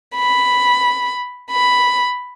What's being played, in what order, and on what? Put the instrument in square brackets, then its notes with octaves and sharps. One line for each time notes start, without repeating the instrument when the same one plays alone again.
[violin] B5
B5